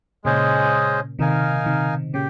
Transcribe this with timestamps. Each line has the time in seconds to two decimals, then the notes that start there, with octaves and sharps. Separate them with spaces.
0.24 A#2 C#3 G#3 C#4 G#4 C5 D#5
1.19 C3 D#3 D#4 A#4 F5 G#5
1.66 C3 D#3
2.14 A#2 C#3 G4